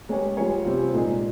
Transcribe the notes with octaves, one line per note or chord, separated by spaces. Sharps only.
G#3 C#4 G4 C#5
G3 C#4 F4 G#4 C#5
C3 G3 C4 F4
A#2 G#3 D#4 G#4